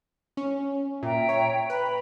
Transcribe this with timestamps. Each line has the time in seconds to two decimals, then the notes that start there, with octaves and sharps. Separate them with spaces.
0.37 C#4
1.03 A#2 E5 G5 A#5
1.29 C#5
1.70 B4 A#5 B5